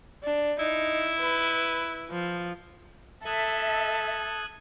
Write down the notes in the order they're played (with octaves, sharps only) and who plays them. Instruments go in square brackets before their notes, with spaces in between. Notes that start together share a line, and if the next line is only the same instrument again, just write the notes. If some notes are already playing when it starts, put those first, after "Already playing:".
[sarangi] D4
[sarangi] D#4 [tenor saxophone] E4
[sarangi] B4
F3
[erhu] A4 [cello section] E5 [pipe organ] D#6 F#6 G#6